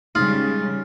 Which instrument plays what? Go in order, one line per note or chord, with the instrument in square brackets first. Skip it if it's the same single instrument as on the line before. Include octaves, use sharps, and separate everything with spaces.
[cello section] C#3 G3 [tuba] G#3 [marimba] D#4 [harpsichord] F4